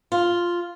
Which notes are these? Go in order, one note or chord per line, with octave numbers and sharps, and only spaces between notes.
F4